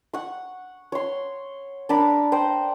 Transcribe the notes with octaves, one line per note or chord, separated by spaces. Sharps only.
F#5 C#6
C#5 C6
D4 A#4 A5 B5
C5 D5 G5